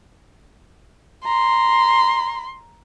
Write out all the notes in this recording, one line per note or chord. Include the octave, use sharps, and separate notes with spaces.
A#5 C6